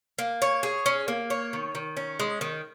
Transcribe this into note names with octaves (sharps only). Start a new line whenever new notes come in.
A#3
C#5
G#4
C#4
A#3
C#5
D#3
D#3
C#4
G#3
D#3